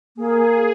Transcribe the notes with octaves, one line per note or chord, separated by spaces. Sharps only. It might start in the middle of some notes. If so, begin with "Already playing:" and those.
A#3 G#4